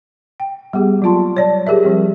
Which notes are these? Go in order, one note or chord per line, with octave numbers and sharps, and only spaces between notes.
G5
G3 B3 G4 G#4
F#3 A#3 F4 A5 C6
C#5 D5 A5
G4 G#4 A#4 E5
F3 G3 C4 G4